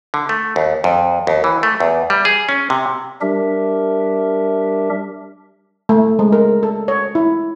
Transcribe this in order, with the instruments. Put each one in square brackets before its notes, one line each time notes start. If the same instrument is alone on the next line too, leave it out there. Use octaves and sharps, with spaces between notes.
[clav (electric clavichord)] D3
A3
D#2
F2
D#2
E3
A3
E2
G3
G#4
C#4
C3
[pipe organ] G3 D4 G4 A#4 E5
[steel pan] A3
G#3
A#4
A4
C#5
E4